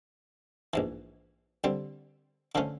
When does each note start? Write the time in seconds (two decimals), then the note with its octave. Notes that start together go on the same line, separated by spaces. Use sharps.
0.73 A#1 G#2 E3
1.64 D3 G3 C4
2.55 D3 F3 A3 C#4